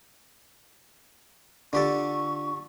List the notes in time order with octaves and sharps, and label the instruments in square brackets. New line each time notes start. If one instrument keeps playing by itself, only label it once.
[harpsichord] D3 G4 A4 [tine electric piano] D4 F4 D5 [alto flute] C#6